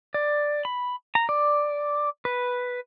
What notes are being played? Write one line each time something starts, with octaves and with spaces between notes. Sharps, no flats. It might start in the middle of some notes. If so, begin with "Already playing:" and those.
D5
B5
A#5
D5
B4